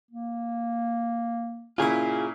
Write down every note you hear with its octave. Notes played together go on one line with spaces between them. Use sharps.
A#3
A#2 C#3 E4 F4 G#4